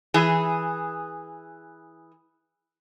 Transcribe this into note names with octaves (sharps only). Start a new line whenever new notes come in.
E3 G#4